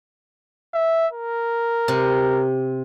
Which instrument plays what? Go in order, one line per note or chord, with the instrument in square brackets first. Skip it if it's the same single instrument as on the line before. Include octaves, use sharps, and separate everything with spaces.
[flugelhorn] E5
A#4
[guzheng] C3